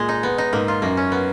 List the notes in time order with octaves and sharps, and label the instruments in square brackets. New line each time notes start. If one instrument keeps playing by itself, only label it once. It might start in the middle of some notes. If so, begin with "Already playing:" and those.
Already playing: [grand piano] A#2 [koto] G#3
[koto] D#4
B3
D#4
[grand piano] G#2 [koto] A#3
[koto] F4
[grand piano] F#2 [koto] A#3
[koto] C#4
B3